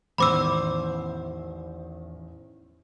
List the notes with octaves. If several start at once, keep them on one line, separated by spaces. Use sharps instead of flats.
A1 E2 D#3 C5 B5 D6 E6